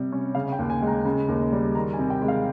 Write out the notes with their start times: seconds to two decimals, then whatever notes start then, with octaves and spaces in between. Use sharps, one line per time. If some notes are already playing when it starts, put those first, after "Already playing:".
Already playing: C3 G3
0.12 C#4
0.35 C#3 F5
0.52 G5
0.59 D#2
0.70 G#5
0.82 G#3
0.87 A#5
1.05 C#3
1.28 D#2
1.52 G3
1.75 D#3 A#5
1.94 G#5
1.99 C3
2.10 G5
2.22 G#3
2.28 F5